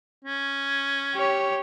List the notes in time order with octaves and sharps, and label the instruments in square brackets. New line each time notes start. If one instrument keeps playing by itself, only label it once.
[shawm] C#4
[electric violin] G4 C#5